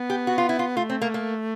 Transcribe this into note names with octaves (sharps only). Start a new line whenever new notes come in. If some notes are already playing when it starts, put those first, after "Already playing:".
Already playing: B3
G4
F#4
F4
E4
F4
A3 F4
C4
A#3
A#3